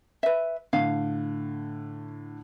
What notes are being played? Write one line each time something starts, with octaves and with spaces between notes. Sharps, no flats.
B4 E5
A2 D3 F5